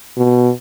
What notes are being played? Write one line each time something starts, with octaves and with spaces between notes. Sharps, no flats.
B2